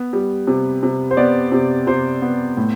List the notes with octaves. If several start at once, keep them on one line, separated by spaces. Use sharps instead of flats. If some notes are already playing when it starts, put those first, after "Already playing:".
Already playing: B3
G3
C3
C3
C5
B3 D5
C3
C3 C5
B3
A2